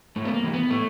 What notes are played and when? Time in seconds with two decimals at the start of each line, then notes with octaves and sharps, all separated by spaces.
0.16 G#2 A3
0.25 B3
0.34 A#3
0.44 E3
0.53 B3
0.71 A2 A3